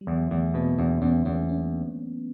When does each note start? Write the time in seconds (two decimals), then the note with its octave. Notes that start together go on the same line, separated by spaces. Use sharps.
0.01 G3
0.07 E2 E3 F#3
0.31 E2 A3 B3
0.54 B2 A#3 C4
0.78 E2 C4 D4
1.02 E2 B3 C#4
1.25 E2 B3 C#4
1.49 C#4